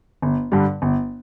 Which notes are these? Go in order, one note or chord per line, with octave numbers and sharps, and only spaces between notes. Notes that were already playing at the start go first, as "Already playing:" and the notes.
G1
G2 D3 G3
G1